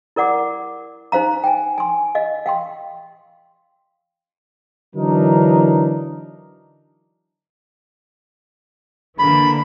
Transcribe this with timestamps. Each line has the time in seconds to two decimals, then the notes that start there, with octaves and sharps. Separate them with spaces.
0.16 E4 A#4 D5 F#5 D6
1.12 D#4 C5 F5 A#5
1.44 G5 G#5
1.78 G#5 C6
2.15 D#5 F5
2.46 F5 G5 C6
4.95 D3 E3 F#3 D4 D#4 A#4
9.19 D3 E3 A#3 B5